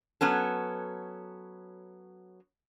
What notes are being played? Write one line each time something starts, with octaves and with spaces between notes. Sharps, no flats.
F#3 B3 C#4 A4